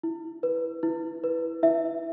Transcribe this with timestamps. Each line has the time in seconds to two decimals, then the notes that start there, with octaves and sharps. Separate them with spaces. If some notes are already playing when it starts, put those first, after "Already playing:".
0.03 E4
0.43 B4
0.83 E4
1.24 B4
1.63 E4 E5